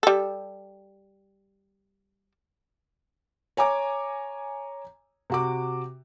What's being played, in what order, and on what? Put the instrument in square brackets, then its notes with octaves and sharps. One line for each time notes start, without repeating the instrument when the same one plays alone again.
[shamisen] G3 A4
[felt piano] C#5 G#5 A#5 D6
C3 F#4 D6